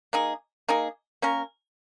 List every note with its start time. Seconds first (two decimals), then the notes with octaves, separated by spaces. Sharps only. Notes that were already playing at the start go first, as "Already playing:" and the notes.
0.13 A#3 D#4 G#4
0.68 A#3 D#4 G#4
1.22 A#3 C#4 A#4